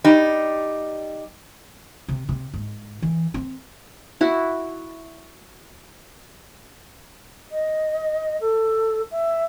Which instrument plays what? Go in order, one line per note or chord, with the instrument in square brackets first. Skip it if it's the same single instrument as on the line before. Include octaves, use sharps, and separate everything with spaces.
[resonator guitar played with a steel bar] G3 D#4 G4
[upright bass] C3
C3
G#2
E3
C4
[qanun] E4 F#4
[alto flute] D#5
A4
E5